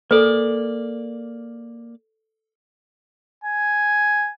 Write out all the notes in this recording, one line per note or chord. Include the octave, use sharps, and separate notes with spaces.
A#3 A4 B4 D5
G#5